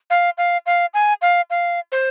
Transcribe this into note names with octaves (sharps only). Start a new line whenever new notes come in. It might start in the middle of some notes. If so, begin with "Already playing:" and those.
F5
F5
F5
G#5
F5
F5
C5